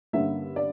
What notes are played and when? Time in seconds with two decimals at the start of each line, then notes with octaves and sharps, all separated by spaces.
0.13 G2 D3 A#3 C#4 E5
0.56 D5